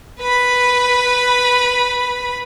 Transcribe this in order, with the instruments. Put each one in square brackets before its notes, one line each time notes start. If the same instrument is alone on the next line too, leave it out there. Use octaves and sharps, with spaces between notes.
[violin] B4 B5